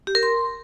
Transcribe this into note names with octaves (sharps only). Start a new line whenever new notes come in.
G4
A#4
C6